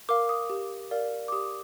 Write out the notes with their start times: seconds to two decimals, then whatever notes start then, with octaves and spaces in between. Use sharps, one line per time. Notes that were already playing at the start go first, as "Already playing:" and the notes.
0.09 A#4 F5 D6
0.29 D#6
0.50 G4
0.91 A#4 D5 F5
1.28 D6
1.32 G4 D#6